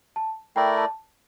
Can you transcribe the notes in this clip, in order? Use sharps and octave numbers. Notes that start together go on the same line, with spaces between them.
A5
A3 E4 A#4 D5 G5
A5